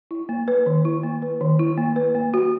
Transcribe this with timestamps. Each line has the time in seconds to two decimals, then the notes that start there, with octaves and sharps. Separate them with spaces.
0.11 E4
0.29 A#3
0.48 B4
0.66 D#3
0.85 E4
1.03 A#3
1.22 B4
1.41 D#3
1.59 E4
1.78 A#3
1.96 B4
2.15 A#3
2.34 F#4